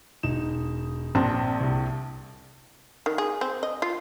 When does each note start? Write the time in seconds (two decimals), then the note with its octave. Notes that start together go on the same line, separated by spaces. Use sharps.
0.23 E1 D#4 E7
1.15 A#1 C4 A5
1.61 C2
3.06 D#3
3.18 G#4
3.41 C4
3.63 D#5
3.82 F4